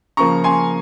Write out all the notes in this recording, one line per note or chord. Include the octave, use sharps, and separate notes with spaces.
C#3 F3 A#3 A#5 C#6
G#5 C6